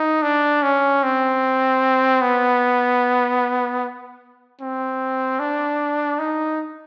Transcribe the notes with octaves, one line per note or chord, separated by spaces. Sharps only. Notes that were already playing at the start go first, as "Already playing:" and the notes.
Already playing: D#4
D4
C#4
C4
B3
C4
D4
D#4